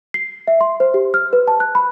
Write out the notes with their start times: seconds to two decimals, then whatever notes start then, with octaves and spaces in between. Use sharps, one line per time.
0.14 C7
0.47 E5
0.61 C6
0.80 C5
0.94 G4
1.14 F6
1.33 B4
1.48 A5
1.60 F#6
1.75 B5